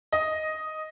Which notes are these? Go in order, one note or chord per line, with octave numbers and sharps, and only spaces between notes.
D#5